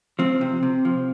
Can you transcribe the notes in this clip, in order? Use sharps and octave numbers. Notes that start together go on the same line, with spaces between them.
F3 C4
C3
C3
F3